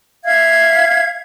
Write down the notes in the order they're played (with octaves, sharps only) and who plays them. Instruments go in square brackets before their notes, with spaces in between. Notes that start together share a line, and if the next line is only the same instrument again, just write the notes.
[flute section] E5 F5 G#6